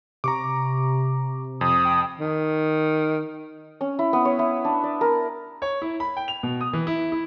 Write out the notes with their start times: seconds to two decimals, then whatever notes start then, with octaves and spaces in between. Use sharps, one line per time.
0.24 C3 A#5 C#6 D6
1.61 F2 D#6
1.85 G5
2.20 D#3
3.81 C#4
3.99 E4
4.13 B3
4.25 C#5
4.39 E4
4.65 D4
4.84 D5
5.01 A#4
5.62 C#5
5.82 E4
6.00 B5
6.17 G5
6.28 F7
6.43 B2
6.61 D#6
6.73 E3
6.87 E4
7.12 E4